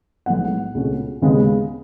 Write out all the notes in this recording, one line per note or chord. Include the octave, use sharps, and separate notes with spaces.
B1 A2 G#3 B3 F#5
C#2 B2 A3 C#4
D#2 C#3 G#3 B3